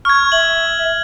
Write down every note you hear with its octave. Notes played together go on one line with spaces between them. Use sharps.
C#6 F6 G#6
E5 F#7